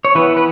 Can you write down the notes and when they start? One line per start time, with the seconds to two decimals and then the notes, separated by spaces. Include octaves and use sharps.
0.05 C#5
0.15 E3 B3 B4
0.37 B4